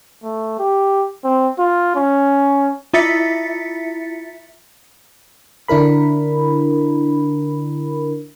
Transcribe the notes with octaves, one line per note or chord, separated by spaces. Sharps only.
A3
G4
C4
F4
C#4
E4 F4 E5 A6 B6 C#7
D3 D4 E4 A#4 B5